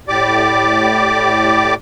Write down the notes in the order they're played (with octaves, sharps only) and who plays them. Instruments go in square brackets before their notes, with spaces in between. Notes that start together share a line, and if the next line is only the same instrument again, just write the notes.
[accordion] A2 G4 D5 D6